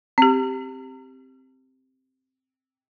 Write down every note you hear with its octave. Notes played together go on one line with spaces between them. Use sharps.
C4 G4